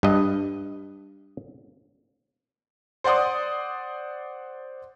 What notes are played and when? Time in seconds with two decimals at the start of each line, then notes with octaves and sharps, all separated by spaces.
0.03 G2 D#5
3.04 C5 D5 F#5 C6 D#6